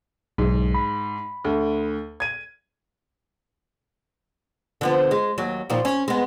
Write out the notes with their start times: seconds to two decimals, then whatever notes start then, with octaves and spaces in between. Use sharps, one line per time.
0.38 B1 G#2
0.75 B5
1.45 D2
2.20 G#6 D#7
4.81 D3 F3 B3
5.11 G#3
5.38 D#2 F#3
5.70 A#2 D#3 F3
5.85 C#4
6.08 G#3 B3